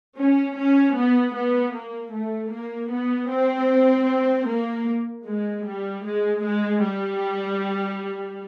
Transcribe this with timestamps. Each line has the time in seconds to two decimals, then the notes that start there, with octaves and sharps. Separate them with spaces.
0.18 C#4
0.57 C#4
0.97 B3
1.35 B3
1.74 A#3
2.14 A3
2.52 A#3
2.91 B3
3.30 C4
4.48 A#3
5.25 G#3
5.64 G3
6.04 G#3
6.43 G#3
6.82 G3